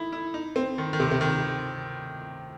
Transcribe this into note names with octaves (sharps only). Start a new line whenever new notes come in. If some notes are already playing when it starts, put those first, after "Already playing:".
Already playing: D#4 E4
E4
D#4
C4
D#3
D#3
C3
C3
D#3